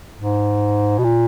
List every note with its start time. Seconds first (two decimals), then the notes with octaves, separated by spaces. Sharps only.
0.19 G#2
0.99 B2
1.04 A#2